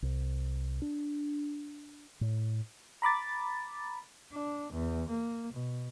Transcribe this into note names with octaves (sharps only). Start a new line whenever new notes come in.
C2
D4
A2
A#5 B5 D6 A6
D4
E2
A#3
B2